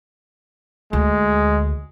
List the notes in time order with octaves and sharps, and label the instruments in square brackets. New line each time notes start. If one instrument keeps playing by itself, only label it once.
[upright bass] D2 [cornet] G#3